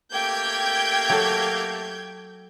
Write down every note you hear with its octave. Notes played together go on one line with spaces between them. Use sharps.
A3 A#3 G4 G5 G6 G#6
F#3 A4